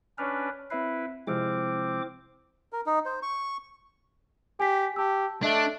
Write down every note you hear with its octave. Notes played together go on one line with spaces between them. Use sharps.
C#4 D4 B4 C#5 F6
C4 E4 B4 E5 C7
C3 F3 G#3 C4 E4 C5 D6 F6
A#4
D#4
C5
C#6
G4 G#5 B6
G4 A5 E6
A3 D4 D#5 E5 F#7